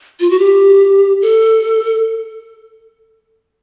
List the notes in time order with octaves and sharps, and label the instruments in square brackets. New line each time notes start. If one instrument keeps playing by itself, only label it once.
[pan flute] F4
F#4
G4
A4